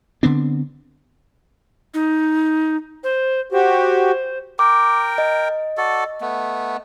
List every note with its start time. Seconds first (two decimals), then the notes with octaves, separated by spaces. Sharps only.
0.23 D3 B3 C4 D4
1.94 D#4
3.04 C5
3.52 F#4 G4 C5
4.59 A#4 G5 D6
5.18 D#5
5.77 F#4 A4 D5
6.21 A3 B3